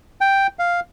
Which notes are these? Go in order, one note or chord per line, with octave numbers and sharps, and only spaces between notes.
G5
F5